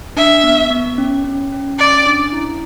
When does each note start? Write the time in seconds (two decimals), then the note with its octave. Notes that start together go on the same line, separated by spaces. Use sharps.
0.17 D4 E5
0.44 B3
0.71 B3
0.98 C#4
1.24 C#4
1.52 C#4
1.79 C#4 D5
2.06 D4
2.33 E4